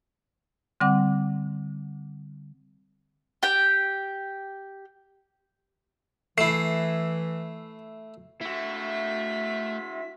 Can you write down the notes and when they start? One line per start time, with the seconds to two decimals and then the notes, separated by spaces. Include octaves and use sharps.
0.80 D3 G3 C4 F#5 D6
3.43 G4 G5
6.38 E3 A3 E4 C7
8.41 A3 E4 F#4 E5 B6